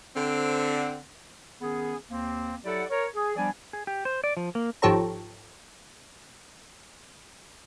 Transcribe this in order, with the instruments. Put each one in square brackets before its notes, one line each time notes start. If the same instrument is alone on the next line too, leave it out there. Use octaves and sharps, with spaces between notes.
[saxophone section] D3 C4
[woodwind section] D#3 B3 C#4 G#4
D#2 A#3 C4
F#3 E4 G4 A4 D5 F#5
A#4 C#5
G#4
F3 G3 B3 D4 D5 G#5
[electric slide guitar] G#4
G4
C5
D5
F3
A#3
[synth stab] G#1 F3 G4 A4 C#5 A#5